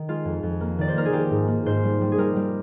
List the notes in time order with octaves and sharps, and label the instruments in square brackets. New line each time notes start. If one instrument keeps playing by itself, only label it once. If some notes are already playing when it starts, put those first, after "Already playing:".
Already playing: [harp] D#3
G#3 F4
F2
F2
A#3
D#3 D5
C5
A#3 A#4
G#4
D#3 G4
G#2
A#3
G#2 C5
G3
G3
G#4
G3 A#4
G3